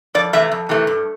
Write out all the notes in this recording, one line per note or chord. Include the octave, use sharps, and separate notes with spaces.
F2 D5
C3 E3 A3 E5
F2
C3 E3 A3
G2